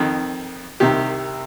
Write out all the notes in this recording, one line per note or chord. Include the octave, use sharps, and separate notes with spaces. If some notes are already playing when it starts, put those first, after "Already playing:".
Already playing: F2 D#3
C2 C3 D#3 G4